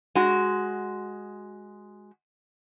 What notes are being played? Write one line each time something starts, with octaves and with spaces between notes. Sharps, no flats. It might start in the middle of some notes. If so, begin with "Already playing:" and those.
G#3 F#4